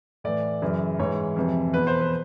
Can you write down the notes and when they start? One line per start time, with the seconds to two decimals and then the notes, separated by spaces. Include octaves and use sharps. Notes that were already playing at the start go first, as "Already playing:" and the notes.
0.24 A2 E3 D5
0.62 F#2 C#3 E3
0.99 G#2 E3 C#5
1.36 F2 C3 E3
1.73 E2 B2 B4
1.87 C5
2.01 B4